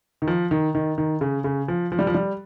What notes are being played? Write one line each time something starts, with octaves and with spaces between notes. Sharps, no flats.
D#3
F3
D#3
D#3
D#3
C#3
C#3
F3
F3
G3
F3
G3